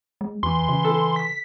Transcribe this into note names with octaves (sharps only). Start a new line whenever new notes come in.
G#3
E2 E3 C6
C#3
A4
B6